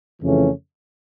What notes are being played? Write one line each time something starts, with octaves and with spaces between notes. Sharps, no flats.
F2 C#3 E3 A3 C#4